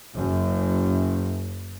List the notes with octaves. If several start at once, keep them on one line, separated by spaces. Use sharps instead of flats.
F#1 F#2